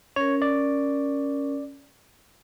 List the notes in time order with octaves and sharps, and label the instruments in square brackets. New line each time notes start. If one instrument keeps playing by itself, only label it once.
[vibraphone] C#4 A#4 [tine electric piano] C#5
[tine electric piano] D5